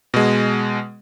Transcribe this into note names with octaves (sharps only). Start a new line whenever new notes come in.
B2 G#3